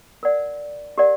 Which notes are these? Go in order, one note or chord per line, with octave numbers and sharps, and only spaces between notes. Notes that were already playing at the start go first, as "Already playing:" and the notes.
A#4 D5 F#5
G4 A#4 D5 F#5